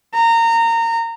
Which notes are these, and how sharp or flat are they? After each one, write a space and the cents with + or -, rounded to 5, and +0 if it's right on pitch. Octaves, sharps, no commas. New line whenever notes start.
A#5 -25